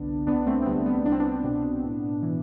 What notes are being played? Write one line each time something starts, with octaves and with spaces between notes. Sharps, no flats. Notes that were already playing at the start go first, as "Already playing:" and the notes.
Already playing: G1 C2 D3 B3 D4
D2 B3 D4
A3 C4
C4
D2 G3 B3
G3 B3
C2 D4
C4
B3 D4
B2
A2
E3